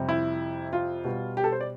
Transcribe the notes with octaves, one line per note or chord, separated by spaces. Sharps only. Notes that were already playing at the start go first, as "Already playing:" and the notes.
Already playing: F2 C3 G3
E4
F4
B2 G3
G4
A4
C5
D5